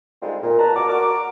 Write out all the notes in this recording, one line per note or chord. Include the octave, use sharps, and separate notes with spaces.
D3 G3 G#3 C4 D#4 F4
A#2
C#2 B2 B4 A5 A#5
A#3 B3 F#4 D6
F#4 A#4 D6